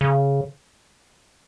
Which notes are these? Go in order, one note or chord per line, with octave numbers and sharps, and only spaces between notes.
C#3